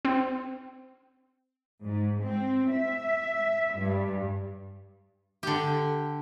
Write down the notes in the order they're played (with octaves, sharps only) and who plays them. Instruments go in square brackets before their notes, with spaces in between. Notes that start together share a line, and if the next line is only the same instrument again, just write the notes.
[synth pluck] C4
[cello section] G#2
C4
E5
G2
[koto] D3 G4